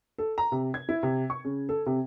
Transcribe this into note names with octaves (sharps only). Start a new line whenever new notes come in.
A4
A#5
C3
G#6
E4
C3
C#6
C#3
A4
C3